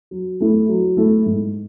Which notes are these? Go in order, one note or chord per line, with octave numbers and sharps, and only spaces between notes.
F#3
A3 E4 A4
F#3
A3 E4 A4
G#2